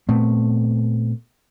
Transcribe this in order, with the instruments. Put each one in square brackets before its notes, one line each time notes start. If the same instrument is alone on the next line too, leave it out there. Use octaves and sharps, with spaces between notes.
[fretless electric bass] A#2 A3 B3 C4